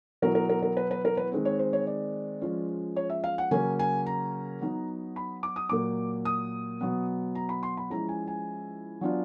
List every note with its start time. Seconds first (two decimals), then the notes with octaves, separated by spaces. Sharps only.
0.22 B2 F#3 B3 E4 A#4
0.35 A#4
0.49 A#4
0.62 A#4
0.77 B4
0.91 B4
1.05 A#4
1.17 B4
1.32 D#3 G#3 C4
1.45 C#5
1.59 C5
1.73 C#5
1.87 D5
2.41 F3 G#3 C#4 F4
2.96 C#5
3.10 E5
3.24 F5
3.38 F#5
3.51 C#3 F#3 A#3 C#4 G#5
3.79 G#5
4.06 A#5
4.61 F#3 B3 D#4
5.16 B5
5.43 D6
5.56 D#6
5.69 A#2 F#3 A#3 D6
6.25 D#6
6.81 B2 F#3 B3
7.35 A#5
7.49 B5
7.63 C6
7.77 B5
7.90 F3 G#3 C#4 E4 A#5
8.09 G#5
8.28 G#5
9.01 F#3 B3 D4 F4